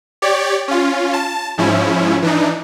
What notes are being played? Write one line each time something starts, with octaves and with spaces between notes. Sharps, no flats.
G4 C#5 D5
C#4 F4
A5
G#2 F3 C#4 E4
E3 D4 D#4